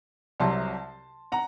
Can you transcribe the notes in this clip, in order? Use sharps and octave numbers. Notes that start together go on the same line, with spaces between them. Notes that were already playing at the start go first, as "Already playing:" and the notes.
C2 C3 F#3 A5 C6
F#5 A#5